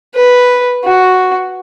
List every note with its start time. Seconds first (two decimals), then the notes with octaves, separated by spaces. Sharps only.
0.15 B4
0.84 F#4